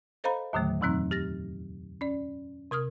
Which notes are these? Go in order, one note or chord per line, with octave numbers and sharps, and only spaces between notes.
A4 C5 D#5 F5 A#5 B5
D#2 A2 D3 D#3 F#3 A3
F2 B2 E3 F#3 C4 D#4
G4 A6 A#6
C#4 D5
C3 A#4 D#6 F6